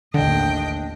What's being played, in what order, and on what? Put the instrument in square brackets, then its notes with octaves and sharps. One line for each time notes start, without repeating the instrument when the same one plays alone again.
[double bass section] A1 D#2 [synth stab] D3 [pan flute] D4 [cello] D#5 G5